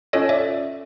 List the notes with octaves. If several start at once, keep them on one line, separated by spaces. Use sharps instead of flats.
C#4 F4 A4 C#5 D#5
D5 E5